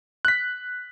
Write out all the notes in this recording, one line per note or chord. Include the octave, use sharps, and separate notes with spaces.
F#6 B6